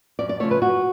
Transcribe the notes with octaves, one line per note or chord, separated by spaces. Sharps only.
F#2 D5
D5
C#3 F3 A3 C#5
B4
F#2 F#4